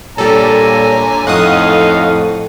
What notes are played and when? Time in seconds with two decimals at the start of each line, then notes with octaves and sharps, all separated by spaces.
0.18 A#2 D3 G3 A4 C#5 G#5 A#5
1.27 F2 A2 D#4 F5 F#5 C#6 D#6